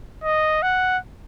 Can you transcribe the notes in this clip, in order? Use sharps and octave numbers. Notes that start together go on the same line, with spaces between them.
D#5
F#5